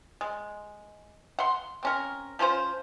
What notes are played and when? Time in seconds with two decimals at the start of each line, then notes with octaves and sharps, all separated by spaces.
0.21 G#3
1.39 F#5 C6
1.83 C4 C#4 A#4
2.39 F3 C#4 F4 C5